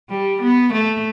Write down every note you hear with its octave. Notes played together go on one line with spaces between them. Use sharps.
G3
B3
A3